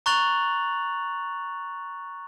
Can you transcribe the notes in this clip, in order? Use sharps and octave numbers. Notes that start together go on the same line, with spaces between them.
A#5 C#6 F#6 A6 F7 F#7